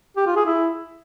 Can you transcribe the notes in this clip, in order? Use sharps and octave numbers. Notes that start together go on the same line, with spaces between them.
G4
F4
G#4
E4